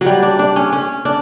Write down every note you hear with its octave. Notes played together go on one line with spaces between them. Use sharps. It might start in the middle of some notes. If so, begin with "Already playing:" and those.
F#3 G3
D4
D4
C#4
C#4
D4